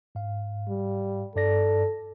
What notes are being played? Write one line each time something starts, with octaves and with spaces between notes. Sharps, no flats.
G#2 F5
G3
G2 A4 D5 A#6